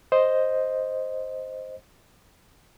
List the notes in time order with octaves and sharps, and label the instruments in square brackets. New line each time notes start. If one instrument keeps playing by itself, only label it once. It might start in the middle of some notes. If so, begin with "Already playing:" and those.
[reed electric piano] C5 D#5